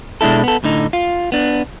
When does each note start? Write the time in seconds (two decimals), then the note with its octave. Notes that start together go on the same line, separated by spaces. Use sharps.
0.21 B2 G#3 D4 E4 A4
0.44 B3 A4
0.64 A2 D3 D#4
0.93 F4
1.32 B3 D4